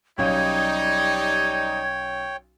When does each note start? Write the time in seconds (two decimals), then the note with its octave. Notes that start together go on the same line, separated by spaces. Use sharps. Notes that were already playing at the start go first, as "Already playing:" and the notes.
0.18 B1 G3 C#4 D#4 C#5 F5 G5 G#6